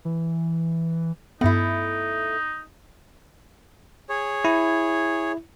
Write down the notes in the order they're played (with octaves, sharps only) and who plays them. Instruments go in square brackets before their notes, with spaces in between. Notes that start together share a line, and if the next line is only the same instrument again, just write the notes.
[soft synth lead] E3
[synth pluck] G2 B3 [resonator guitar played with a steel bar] A3 E4 [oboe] D#4
[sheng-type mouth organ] G#4 C#5
[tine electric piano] E4